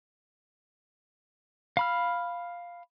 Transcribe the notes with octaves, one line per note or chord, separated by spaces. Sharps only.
F5 B5 F6